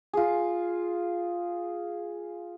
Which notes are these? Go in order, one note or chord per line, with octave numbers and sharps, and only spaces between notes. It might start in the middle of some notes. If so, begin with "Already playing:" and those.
F4 G#4